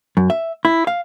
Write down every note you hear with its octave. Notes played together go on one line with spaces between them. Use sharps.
F#2
E5
E4
F5